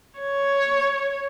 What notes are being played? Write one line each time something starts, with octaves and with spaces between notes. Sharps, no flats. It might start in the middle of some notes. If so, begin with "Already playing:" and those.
C#5